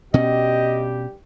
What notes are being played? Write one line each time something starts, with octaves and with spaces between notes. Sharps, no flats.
G2 B2 C#4 G4 D#5